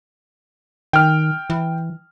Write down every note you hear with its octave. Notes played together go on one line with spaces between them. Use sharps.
D#3 G5 F6
E3